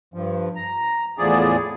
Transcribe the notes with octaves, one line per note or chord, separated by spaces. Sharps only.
G2 F3
A#5
E2 A2 F3 G#4 D5